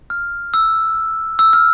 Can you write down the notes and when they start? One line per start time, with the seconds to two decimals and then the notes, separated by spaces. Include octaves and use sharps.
0.10 F6
0.54 E6
1.39 E6
1.53 F6